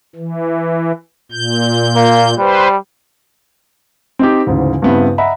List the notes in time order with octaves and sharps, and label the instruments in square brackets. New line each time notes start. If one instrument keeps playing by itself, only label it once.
[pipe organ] E3
A#2 G6
[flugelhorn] A#3
[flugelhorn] G3 [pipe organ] B4 C5
[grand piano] C4 D#4 G4
D2 G#2 C#3 E3
G2 C#3 B3 C4 E4
D#5 E5 F#5 A#5 B5